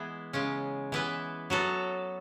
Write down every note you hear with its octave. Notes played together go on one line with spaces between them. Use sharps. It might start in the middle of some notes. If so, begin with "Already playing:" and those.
Already playing: E3 G#3 B3 E4 G#4
C#3 G#3 C#4
E3 B3 E4 B4
F#3 B3 F#4 A4